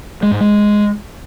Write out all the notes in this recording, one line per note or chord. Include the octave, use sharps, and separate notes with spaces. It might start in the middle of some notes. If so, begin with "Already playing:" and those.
G#3
G#2
G#3